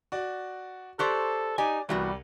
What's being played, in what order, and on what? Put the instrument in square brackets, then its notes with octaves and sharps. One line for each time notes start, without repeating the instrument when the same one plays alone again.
[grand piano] F#4 D5
[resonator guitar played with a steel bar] G4 C5 D5 [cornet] A4 [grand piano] C6 C#6 F#6
[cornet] D#4 [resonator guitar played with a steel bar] G4 G#5 [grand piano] D5
[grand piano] C2 [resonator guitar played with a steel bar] E3 B3 F#4 [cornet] G3